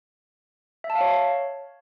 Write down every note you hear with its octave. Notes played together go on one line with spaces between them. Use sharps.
E5
A5
F5
C#5